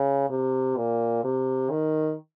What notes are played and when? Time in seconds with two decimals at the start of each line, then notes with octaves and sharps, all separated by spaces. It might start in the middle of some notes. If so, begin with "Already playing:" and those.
Already playing: C#3
0.30 C3
0.77 A#2
1.24 C3
1.71 D#3